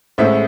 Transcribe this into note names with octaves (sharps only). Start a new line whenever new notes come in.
A1 A2 G#3 C5 E5